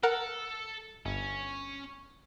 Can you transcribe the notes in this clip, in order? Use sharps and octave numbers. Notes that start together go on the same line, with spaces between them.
A4 A#4 F#5
G1 C#4